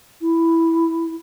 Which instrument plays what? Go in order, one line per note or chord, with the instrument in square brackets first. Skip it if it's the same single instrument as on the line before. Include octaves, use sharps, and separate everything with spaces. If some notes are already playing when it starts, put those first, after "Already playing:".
[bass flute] E4